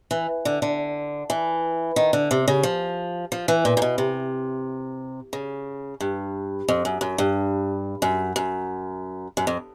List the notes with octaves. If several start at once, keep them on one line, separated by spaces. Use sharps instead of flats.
E3
D3
D3
E3
D#3
D3
C3
C#3
F3
F3
E3
A#2
A#2
B2
C3
C#3
G2
F2
F#2
F#2
G2
F#2
F#2
F#2
F2